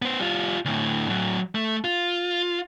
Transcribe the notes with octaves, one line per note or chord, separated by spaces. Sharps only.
B3 C5
G3 F4
D2 A2
A2 F#3
A3
F4